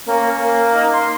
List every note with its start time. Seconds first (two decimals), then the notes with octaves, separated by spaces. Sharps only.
0.06 A#3 C#4
0.37 A#3
0.73 D#4
0.93 C6